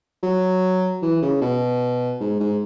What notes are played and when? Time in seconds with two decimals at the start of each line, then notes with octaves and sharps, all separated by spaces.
0.23 F#3
1.02 E3
1.22 C#3
1.41 B2
2.20 G#2
2.40 G#2